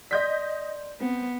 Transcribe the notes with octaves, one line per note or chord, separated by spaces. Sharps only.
D5 D#5 C6 G6 B6
B3 C4